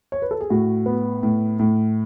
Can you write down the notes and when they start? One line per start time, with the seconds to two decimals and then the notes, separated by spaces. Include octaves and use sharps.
0.12 C#5
0.22 B4
0.31 A4
0.41 G#4
0.50 A2 F#4
0.86 B3
1.23 A2
1.59 A2